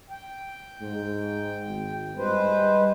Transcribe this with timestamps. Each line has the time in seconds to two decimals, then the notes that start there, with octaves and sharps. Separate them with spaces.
0.10 G5
0.82 G#2
1.67 G#1
2.17 G2 G#3 B4 C5
2.55 G3